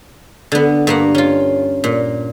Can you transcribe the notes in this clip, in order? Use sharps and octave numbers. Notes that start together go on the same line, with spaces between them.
D3 B3
G2 A#3 F#5
C#4 F4
A#2